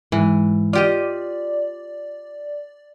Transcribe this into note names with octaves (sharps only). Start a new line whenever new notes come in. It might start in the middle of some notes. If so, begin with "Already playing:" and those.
G#2 E3
F4 G4 D5 D#5